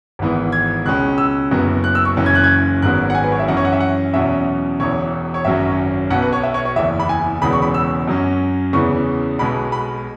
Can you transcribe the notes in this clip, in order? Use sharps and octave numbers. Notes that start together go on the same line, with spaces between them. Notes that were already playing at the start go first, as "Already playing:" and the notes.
G#1 G#2 E3 B3
G#6
C#2 B2 G#3 C#4 F#6
E6
F#1 F#2 F#3 B3
F#6
E6
C#6
F#1 F#2 E3 C#4
G#6
F#6
G#6
G#1 G#2 F#3 B3 F#6
F#5
G#5
B4
C#5
E5
F#2 E3 C#4 F#5
C#5
F#5
E5
F#5
E2 B2 F#3 C#4 E5
E1 E2 E3 C#5
C#5
G#1 F#2 F#3 C#4 E5
B1 B2 B3 F#5
B4
C#5
E5
C#5
C#5
F#1 E2 E3 E5
B5
G#5
E1 E2 C#3 G#3 B3 B5
C#6
B5
E6
F#2 F#3 C#4
E2 C#3 E3 B3 C#6
B1 B2 G#3 B3 B5
B5